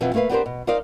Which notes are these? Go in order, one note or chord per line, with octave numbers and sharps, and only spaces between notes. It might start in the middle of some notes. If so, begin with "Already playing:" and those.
F2 B2 E3 B3 C4
A3 A#3 A#4 B4 F5
B3 D4 G4 A#4 C5
B2
D#4 A#4 C5 D5 D#5 F5